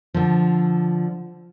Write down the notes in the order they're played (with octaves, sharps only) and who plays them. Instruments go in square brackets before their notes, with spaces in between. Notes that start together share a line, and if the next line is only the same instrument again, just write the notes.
[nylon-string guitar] D3 F3